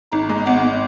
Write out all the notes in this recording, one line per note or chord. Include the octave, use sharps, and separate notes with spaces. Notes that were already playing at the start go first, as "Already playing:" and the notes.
G#1 D#4
G#3
G#1 B3